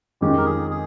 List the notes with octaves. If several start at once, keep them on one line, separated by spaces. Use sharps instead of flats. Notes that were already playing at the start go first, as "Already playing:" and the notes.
F2 D#3 G#3 C#4 G4
A#4
G#4
G#4